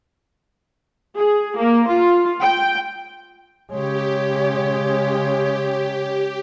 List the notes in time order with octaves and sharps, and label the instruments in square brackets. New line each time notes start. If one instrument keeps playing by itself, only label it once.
[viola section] G#4
A#3
F4
G5
[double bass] C#3 G#3 [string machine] G4 [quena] C#5